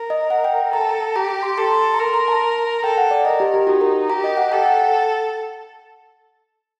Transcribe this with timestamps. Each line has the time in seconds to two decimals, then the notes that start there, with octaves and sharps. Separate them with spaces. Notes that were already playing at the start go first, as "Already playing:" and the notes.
Already playing: A#4
0.10 D#5
0.30 F#5
0.44 G5
0.73 A4 A#5
0.81 A5
0.89 A#5
1.15 G4 A#5
1.29 A#5
1.43 C6
1.57 A4 C6
1.94 A#5
1.99 A#4 C6
2.14 A#5
2.28 A5
2.84 A4 G5
2.98 F#5
3.11 D5
3.25 A#4 D#5
3.40 G4
3.54 G4
3.67 D#4 F#4
3.81 A#4
4.09 G4 A#5
4.24 D#5
4.37 F#5
4.52 A4 G5
4.66 F#5